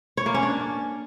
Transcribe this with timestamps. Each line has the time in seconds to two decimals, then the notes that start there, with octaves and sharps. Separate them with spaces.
0.17 C#5
0.26 A#3
0.34 C#4
0.43 D4